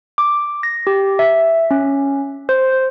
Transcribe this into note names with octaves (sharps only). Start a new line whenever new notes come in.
D6
A#6
G4
E5
C#4
C5